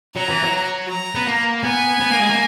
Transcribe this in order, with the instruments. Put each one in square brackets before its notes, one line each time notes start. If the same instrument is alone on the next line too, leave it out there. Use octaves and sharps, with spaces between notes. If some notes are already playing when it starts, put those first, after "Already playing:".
[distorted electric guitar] F#3 [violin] A#5
[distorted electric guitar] E3
F#3
[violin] A#5
[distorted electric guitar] B3
A#3
[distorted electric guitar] B3 [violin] G#5
[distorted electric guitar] B3
A#3
G#3
A#3